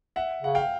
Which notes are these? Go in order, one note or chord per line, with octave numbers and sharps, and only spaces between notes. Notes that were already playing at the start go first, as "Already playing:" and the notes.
E5 F#5
C#3 F#5
F5 G5